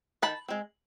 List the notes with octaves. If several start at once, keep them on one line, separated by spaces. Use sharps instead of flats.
D#3 A5 B5
G#3 C4